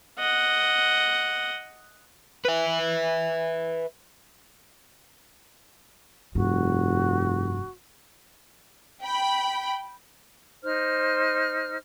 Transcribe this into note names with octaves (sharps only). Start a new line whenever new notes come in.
D#5 F#5
B4 E5
F1 G2 F#4
G5 B5
D#4 C5 F6